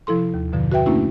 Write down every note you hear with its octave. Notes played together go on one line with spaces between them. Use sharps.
C3 F3 E4 A4 C6
D#2
F#2 B2 D3 F3
F#4 B4 E5 G5
A3 A#3 C#4 D4 E4 F#4